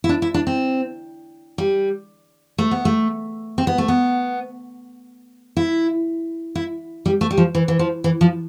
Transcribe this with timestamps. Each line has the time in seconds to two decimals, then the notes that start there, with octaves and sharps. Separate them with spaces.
0.04 E4
0.09 D4
0.22 E4
0.34 D4
0.47 C4
1.58 G3
2.58 A3
2.71 B3
2.85 A3
3.58 C4
3.67 B3
3.78 A3
3.88 B3
5.57 E4
6.55 E4
7.06 G3
7.21 A3
7.31 G3
7.38 F3
7.55 E3
7.68 E3
7.79 F3
8.04 E3
8.21 F3